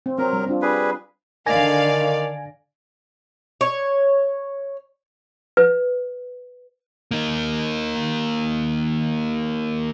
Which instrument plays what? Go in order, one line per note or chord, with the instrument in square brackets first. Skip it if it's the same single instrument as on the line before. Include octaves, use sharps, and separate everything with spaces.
[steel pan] C4
[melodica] F#3 A#4 [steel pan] C4
[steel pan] G3
C4 D4 F4
[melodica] G3 G#4 B4
[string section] D3 F5 [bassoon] D#3 [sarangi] D5 [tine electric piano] G#5 G#6 A#6
[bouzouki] C#5
[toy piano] B4
[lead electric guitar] A#3 D#4